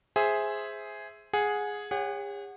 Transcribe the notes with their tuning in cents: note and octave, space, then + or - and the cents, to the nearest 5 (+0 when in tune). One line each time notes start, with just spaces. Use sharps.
G#4 +0 C5 +0 E5 +0
G#4 +0 F#5 -25
G#4 -45 C#5 +0 F#5 +0